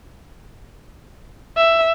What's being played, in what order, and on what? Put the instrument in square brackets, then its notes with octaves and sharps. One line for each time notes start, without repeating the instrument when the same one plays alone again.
[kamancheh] E5